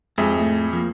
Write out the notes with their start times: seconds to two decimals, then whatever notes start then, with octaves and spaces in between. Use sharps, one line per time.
0.18 F2 G#2 G#3 G4 G#4 E5
0.39 A2 A3
0.73 F3 A#3